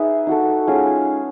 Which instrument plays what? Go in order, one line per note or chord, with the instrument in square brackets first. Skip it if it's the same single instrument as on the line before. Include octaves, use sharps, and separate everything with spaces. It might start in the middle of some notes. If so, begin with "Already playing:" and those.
Already playing: [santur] D#4 G#4 B4 E5
D#4 F#4 A4
G#3 C#4 F4